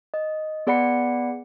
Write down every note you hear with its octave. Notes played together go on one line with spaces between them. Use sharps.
D#5
B3 G#4 D5 F#5 B5 C#7